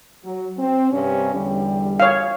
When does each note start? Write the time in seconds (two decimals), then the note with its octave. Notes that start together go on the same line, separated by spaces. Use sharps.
0.24 F#3
0.58 C4
0.91 G2 C3 C#4
1.34 E2 D3 G3
2.00 C#5 F5